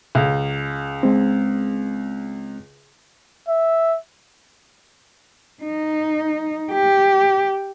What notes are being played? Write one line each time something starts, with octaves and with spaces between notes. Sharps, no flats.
C#2
G#3 C4
E5
D#4
G4